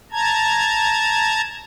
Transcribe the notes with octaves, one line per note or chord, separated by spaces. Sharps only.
A5 A#5 G#6